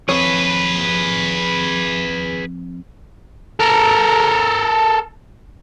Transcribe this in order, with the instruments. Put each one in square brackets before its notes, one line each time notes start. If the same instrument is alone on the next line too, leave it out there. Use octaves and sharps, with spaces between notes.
[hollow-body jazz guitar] F2 C#5 [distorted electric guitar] G#4 B4
[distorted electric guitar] A4 A#4